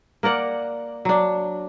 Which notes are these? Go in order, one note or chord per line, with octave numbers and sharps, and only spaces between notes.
A#3 A#4 D5 F#5
F#3 D4